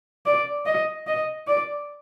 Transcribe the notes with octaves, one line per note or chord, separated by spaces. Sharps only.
D5
D#5
D#5
D5